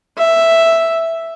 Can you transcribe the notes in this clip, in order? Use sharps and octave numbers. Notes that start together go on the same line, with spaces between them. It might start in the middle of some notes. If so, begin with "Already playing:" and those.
E5